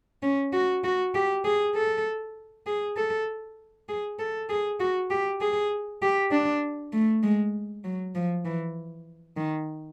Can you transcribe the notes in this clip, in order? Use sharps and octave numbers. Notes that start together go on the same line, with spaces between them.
C#4
F#4
F#4
G4
G#4
A4
G#4
A4
G#4
A4
G#4
F#4
G4
G#4
G4
D4
A3
G#3
F#3
F3
E3
D#3